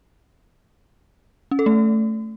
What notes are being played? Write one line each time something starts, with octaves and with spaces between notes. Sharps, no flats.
C#4
A4
A3